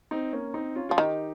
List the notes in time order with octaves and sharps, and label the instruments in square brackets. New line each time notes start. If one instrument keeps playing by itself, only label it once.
[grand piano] C4 D#4
A#3 C#4
C4 D#4
C#4 F4
[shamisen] F3 [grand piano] F4
[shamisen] D#3 [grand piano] D#4 G4